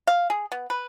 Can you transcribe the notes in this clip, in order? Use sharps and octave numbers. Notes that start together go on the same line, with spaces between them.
F5
G#4
B3
B4